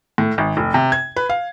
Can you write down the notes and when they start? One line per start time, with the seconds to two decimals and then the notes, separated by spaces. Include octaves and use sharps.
0.18 A2
0.38 G#1
0.57 F1
0.74 C3
0.92 G#6
1.16 B4
1.29 F5